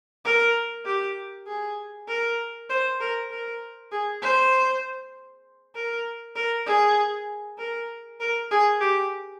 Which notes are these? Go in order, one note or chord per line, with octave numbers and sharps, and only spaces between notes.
A#4
G4
G#4
A#4
C5
A#4
A#4
G#4
C5
A#4
A#4
G#4
A#4
A#4
G#4
G4